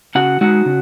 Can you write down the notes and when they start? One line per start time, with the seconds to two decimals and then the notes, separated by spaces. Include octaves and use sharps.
0.15 C#3 F#4 F#5
0.41 G#3 D#4 F#4 F#5
0.66 C#3